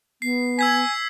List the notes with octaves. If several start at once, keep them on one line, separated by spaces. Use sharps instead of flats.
B3 C7
G#5 E6 G#6 B6